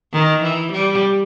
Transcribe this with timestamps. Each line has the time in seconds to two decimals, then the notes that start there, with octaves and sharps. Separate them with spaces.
0.13 D#3
0.43 E3
0.72 G3